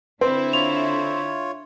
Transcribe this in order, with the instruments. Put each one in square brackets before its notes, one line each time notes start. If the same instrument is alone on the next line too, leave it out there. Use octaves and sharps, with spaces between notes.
[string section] D3 E4 [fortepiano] C4 [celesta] B4
[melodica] F4 C#5 [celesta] F7